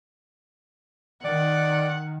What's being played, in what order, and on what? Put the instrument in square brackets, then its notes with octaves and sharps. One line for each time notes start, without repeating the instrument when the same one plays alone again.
[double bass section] D#3 [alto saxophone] D5 [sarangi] F#5